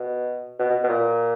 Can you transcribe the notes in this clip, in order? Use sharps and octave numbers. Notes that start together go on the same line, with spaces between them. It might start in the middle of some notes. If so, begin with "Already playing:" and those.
Already playing: B2
B2
B2
B2
A#2